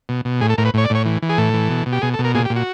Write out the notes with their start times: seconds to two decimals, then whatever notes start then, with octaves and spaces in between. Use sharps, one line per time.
0.09 B2
0.25 B2
0.41 A2 G#4
0.50 A4
0.58 A2 A#4
0.65 B4
0.74 A2 C#5
0.85 D5
0.90 A2 C#5
1.06 E3
1.22 E3
1.29 G#4
1.38 A2 A4
1.54 E3
1.70 B2
1.86 B2
1.92 G4
2.02 B2 G#4
2.14 A4
2.19 B2
2.24 A#4
2.35 A#2 G#4
2.45 G4
2.50 A#2
2.56 F#4